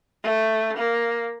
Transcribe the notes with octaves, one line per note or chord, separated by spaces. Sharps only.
A3
A#3